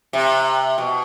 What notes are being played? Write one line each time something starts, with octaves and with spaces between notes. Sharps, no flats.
C3
B2